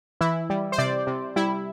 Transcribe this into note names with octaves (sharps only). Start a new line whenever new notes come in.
E3 E4
G3
C5
C3 D5
C3
G3 E4